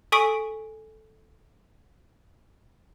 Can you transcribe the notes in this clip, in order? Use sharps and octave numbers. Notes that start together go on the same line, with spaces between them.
A4 G#5 C#6 D#6 B6 D7